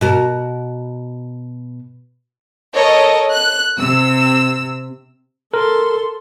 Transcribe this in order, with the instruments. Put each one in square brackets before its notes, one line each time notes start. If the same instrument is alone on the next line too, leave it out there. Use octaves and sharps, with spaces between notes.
[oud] B2 F#4 A#4
[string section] A4 A#4 C#5 D#5
F#6
C3 E6
[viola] A4 C6 [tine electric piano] A#4